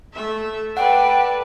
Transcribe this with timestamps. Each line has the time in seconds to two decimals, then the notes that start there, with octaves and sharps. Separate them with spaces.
0.14 A3 E5
0.77 A4 B4 D5 F#5 G5